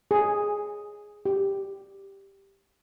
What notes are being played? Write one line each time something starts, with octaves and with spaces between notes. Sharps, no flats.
G#4
G4